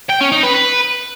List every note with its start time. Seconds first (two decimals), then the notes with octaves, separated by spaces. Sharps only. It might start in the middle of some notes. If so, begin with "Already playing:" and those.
0.09 G5
0.21 C#4
0.32 D#4
0.43 B4
0.55 B4